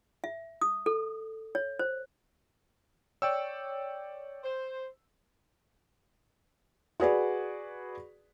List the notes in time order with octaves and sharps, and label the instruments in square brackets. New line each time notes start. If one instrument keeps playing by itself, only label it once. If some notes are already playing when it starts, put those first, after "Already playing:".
[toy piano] E5
D#6
A4
C#5
C5
[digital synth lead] C#5 [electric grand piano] D5 G5 E6
[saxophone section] C5
[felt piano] F#4 G#4 B4 D5